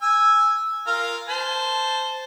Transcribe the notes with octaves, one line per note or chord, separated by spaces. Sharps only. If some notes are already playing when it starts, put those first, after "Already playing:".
G#5 E6
F4 A#4 F5
C5 A5